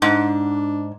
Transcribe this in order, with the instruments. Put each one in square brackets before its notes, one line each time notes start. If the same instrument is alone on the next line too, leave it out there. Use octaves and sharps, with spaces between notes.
[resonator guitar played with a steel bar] G#2 [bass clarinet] D4